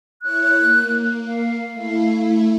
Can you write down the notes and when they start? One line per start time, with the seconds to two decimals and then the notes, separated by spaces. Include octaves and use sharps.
0.22 E4 C#5 F#6
0.56 A#3
1.26 F5
1.73 A3 E4